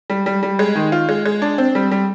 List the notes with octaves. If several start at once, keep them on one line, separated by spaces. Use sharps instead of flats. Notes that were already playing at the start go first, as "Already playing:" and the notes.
G3
G3
G3
G#3
D#3
F4
G#3
G#3
D4
C4
G3
G3